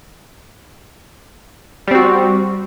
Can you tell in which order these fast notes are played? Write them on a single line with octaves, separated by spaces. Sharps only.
G3 C4 F#4